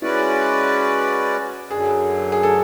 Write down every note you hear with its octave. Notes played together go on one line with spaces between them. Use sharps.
G#3 C#4 E4 F#4 B4 D5
F#2 D3 F#3 G#4
G#4
A4